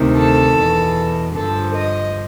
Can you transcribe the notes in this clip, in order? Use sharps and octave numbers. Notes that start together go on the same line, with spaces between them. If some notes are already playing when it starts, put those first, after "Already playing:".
Already playing: D2 C3 D#3
A4
E2 B2
G2 D3 F3 A4
D#5